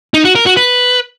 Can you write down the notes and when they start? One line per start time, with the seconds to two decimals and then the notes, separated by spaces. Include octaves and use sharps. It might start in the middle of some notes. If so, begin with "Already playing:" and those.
0.14 D#4
0.25 F#4
0.35 A#4
0.46 F#4
0.57 B4